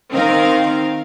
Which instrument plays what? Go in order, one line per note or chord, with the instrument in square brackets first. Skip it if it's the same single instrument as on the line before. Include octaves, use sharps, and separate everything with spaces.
[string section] D#3 C4 D#4 A#4 F5